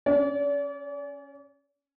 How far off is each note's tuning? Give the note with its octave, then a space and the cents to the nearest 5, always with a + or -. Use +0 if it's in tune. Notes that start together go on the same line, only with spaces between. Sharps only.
C#4 +0 D5 -40